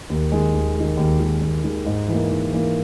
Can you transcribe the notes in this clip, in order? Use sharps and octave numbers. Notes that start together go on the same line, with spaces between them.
D#2
D#3 G#3
D#2
G#3
D#3
D#2
D#3 G#3
D#2
D#3 G#3
G#2
E3 A#3
G#2
E3 A#3